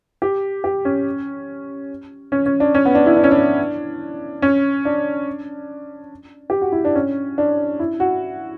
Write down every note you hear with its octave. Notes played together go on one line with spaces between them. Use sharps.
G4
G4
C#4
C#4
C#4
D4
C#4
B3
D4
E4
D4
C#4
D4
C#4
D4
G4
F#4
E4
D4
C#4
D4
E4
F#4